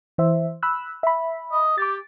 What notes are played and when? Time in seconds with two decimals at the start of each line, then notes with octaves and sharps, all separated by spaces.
0.18 E3 C5 E5
0.63 B5 E6 F#6
1.03 E5 B5
1.52 D#5
1.78 G4 D6 A6